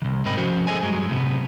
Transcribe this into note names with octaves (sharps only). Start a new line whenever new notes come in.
C2 D#3
G#2 C4 A#4 D#5 G5 B5
F3 C#4 F#4 C5
G#4 A4 C#5 D#5 G#5
G2 F#3 G#3
A2 C3 B3